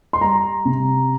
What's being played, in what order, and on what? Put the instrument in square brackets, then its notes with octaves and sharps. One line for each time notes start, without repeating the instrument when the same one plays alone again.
[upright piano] C6
G3 A#5
C3